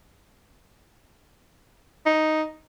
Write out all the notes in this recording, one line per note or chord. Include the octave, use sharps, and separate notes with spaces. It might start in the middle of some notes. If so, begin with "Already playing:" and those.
D#4